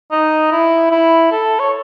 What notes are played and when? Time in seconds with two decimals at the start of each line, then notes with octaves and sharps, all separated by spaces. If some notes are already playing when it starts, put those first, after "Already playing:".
0.11 D#4
0.51 E4
0.91 E4
1.31 A4
1.59 C#5